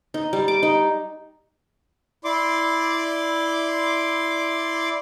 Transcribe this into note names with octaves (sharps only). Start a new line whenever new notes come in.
D#4
G3
D6
D#4
E4 D5 C6 D6